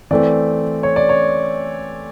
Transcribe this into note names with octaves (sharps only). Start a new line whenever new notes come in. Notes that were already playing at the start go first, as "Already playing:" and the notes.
E3 A3 C4 D5
C#5
D5
C#5